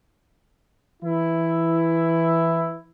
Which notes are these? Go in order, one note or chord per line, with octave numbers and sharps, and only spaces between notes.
E3 E4